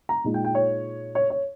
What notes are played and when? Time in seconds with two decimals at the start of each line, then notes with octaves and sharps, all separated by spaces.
0.09 A#5
0.24 A#2 G#3 D#4
0.34 G5
0.45 G5
0.55 C#5
1.15 C#5
1.30 C#5